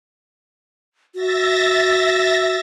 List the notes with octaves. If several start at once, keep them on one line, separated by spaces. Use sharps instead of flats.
F#4 E5 A6 A#6